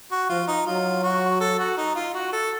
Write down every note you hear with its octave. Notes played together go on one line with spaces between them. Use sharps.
F#4
F3 F4
D#4
F#3 F4
F#4
A4
F#4
D#4
F4
F#4
A4